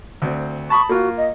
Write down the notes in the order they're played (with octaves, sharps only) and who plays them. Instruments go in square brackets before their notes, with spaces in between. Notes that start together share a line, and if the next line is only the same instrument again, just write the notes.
[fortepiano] D2 C4
[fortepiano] A5 B5 D#6 [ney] C#6
[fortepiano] A#3 F4 [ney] F#4
[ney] D#5